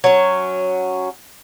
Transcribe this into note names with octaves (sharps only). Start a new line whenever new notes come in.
F#3 C#4